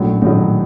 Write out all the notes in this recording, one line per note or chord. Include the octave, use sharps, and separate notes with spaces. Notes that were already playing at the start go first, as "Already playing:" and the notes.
Already playing: A#1 A2 F#3 C#4
A#1 A2 D#3 F#3 D#4